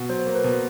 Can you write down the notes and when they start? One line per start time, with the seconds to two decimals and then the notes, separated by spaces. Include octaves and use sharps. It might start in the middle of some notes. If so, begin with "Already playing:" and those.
Already playing: B2
0.09 F#3 C5
0.26 A#3
0.35 B4
0.44 B2